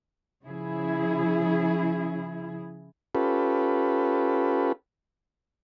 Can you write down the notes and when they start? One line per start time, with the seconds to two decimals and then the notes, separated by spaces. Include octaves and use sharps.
0.43 C#3 F3 E4 G#4
3.15 C#4 F4 G4 A4 B4